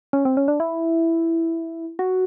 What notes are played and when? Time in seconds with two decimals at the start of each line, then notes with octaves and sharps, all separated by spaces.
0.13 C#4
0.25 C4
0.37 C#4
0.48 D4
0.60 E4
1.99 F#4